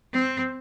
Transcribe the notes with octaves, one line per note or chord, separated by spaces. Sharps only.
C4